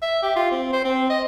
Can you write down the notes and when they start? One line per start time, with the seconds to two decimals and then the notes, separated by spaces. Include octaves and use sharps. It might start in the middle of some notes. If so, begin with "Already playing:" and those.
0.02 E5
0.22 G4
0.36 F4
0.51 C4
0.73 C5
0.84 C4
1.10 D#5